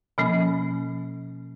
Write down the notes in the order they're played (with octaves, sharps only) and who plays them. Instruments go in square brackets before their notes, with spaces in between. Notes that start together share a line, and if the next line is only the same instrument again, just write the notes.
[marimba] B2 F3 A#3 C#4